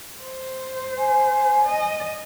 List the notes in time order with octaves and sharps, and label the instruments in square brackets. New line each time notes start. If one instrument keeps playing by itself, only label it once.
[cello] C5
[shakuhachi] G#5
[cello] D#5